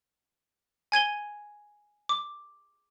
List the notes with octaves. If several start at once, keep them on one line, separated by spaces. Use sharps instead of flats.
G#5 G#6 D#7 G7
D6